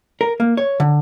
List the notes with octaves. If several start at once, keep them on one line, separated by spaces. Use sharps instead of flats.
A#4
A#3
C#5
D3